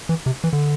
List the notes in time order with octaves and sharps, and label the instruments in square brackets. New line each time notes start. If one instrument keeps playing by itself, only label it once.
[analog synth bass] E3
C3
E3
D3